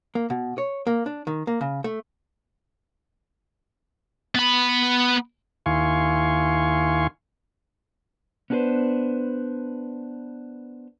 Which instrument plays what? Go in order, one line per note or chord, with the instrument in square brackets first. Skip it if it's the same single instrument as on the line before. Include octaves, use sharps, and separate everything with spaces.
[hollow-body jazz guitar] A#3
B2
C#5
A#3
D4
D#3
A#3
C#3
A3
[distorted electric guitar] B3 B5
[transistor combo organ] D#2 E4 F5 G#5 C6 C#6
[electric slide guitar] B3 C#4 D4 F#4 B4 C5